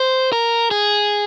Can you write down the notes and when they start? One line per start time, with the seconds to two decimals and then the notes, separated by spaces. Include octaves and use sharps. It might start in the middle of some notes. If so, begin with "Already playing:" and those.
Already playing: C5
0.32 A#4
0.71 G#4